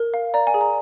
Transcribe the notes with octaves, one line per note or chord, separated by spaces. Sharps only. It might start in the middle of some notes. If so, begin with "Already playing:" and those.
Already playing: A#4
F5
D5 A#5
G#5
G#4
A#5